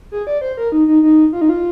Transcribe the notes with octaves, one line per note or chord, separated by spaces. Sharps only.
G#4
D5
C5
A#4
D#4
D#4
D#4
F4
D#4
F4